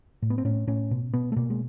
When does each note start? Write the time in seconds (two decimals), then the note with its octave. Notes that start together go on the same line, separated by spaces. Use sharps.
0.22 A2
0.30 B3
0.38 C4
0.45 A2 C#4
0.67 A2 C#4
0.91 B2
1.14 B2 B3
1.32 A3
1.36 B2 A#3
1.50 G#3